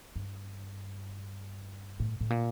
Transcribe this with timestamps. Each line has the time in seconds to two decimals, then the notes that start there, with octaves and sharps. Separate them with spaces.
0.16 G2
2.00 A2
2.21 A2
2.30 A#2